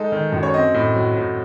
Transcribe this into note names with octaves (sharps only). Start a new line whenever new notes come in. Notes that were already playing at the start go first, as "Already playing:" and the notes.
Already playing: G#3 D#4 A4
D#3
F#2
C#5
C4 D#5
A2
F#3
A2